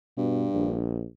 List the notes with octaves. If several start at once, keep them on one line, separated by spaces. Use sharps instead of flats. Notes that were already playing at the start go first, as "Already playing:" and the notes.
G2 B2
A#1